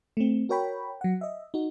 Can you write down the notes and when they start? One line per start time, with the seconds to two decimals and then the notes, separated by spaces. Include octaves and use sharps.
0.17 A3 C4
0.49 F#4 A#4 C#5 G5 B5
1.01 F#3 F#5
1.21 D#5 E5
1.54 D#4 F#4